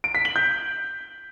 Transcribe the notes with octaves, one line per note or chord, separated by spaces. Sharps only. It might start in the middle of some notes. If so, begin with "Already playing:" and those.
D7
B6
F#7
G6